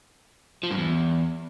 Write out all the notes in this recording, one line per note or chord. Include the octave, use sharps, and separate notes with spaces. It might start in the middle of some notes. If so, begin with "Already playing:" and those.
F3
G2
E2